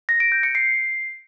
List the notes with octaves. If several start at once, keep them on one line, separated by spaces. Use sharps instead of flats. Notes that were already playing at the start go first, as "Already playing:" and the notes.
A#6
D7
G6
C#7
C7